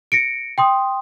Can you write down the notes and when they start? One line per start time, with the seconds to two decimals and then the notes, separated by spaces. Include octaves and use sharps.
0.12 A#6 C#7 D7
0.58 G5 C6 D#6